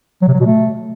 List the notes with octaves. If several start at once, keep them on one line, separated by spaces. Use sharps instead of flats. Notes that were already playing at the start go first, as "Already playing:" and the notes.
F#3
C3
F#3
B2
A3